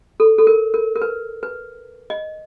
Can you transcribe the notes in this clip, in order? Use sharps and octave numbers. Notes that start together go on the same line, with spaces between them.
A4
A4
A#4
A#4
A#4
B4
B4
D#5